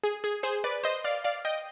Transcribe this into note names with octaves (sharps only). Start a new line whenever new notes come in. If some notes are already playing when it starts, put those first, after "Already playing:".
G#4
G#4
G#4 C5
B4 D5
C5 D#5
D5 F5
D5 F5
D#5 G5